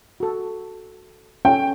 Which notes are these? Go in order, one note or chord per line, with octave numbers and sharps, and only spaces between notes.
F#4 A4
C#4 A4 G5